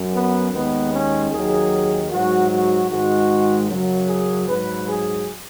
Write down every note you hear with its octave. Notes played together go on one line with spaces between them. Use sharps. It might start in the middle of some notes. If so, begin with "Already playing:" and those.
Already playing: F#2 F#3
B3
D#2 D#3 G#3 B3
C#4
D#2 D#3 F#3 G#4
G#2 F#3 F#4
F#4
G#2 D#3 G#3 F#4
F#2 C#3 F#3
G#4
G#2 F#3 B4
G#4